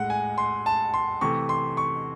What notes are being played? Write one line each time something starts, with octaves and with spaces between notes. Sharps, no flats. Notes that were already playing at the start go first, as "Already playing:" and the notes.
Already playing: A2 G#3 F#5
G#5
C6
A5
C6
C3 E3 A3 C#6
C6
C#6